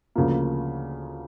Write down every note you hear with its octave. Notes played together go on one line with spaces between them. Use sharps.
D2 C#3 F3 A#3